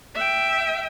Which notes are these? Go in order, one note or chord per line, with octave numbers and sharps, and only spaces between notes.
E5 G5